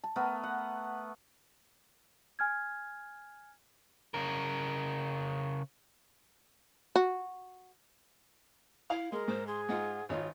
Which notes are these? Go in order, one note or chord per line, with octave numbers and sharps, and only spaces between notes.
A5
A3 B3 A#4
F#5
G#5 F6 G#6
C#3 A#4
F#4
E4 F5
G#3 A#4 C6
G#2 C5
G#4 C6
G#2 D#4 F4 F#5
G#1 D#4 F4 C#5